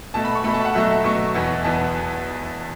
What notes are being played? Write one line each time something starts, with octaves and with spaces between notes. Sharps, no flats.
B2 A3 A5
B5
C#6
B2 A3 B5
A5
F#5
B2 F#3 A3 E5
B2 F#3 A3 C#6
E2 B2 B3
E2 B2 B3 A5